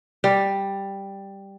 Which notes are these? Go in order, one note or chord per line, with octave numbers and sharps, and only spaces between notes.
G3